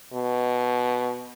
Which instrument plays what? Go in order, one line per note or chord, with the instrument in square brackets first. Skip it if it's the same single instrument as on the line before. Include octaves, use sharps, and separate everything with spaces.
[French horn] B2